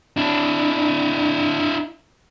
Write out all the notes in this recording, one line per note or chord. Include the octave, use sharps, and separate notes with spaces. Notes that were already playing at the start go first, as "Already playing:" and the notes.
D4 E4